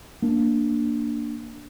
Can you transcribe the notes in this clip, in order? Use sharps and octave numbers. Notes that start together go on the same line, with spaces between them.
A#3 D4